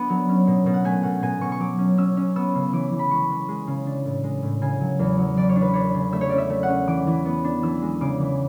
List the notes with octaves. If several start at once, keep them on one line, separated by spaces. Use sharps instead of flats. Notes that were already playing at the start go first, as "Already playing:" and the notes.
Already playing: B3 D4
F#3
C#4
B2
B2
F#5
A3 G#5
B2 F#5
B2 G#5
B2 C#6
C#6
F#3 D6
C#4
C#4 E6
C#4
B3 E6
C#3
E3 D6
E3
B5
G#3 C#6
G#3
G#3
C#3
D4
A2
G#3
A2
C#3 G#5
F#3
E2
F#3
E3 D5
C#5
D4
B4
D4 C#5
C#3
A3 E5
C#5
C#4 D5
E5
A3
F#5
C#4
E3 D6
E3
B3
D4
E3 E6
G#3
C#3 D6
E3